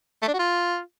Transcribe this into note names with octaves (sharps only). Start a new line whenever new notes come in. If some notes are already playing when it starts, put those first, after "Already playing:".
A3
D4
F#4
F4